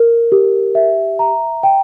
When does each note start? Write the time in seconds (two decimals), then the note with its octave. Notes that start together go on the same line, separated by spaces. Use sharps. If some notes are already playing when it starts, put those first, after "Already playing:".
Already playing: A#4
0.32 G4
0.75 E5
1.19 A#5
1.63 G5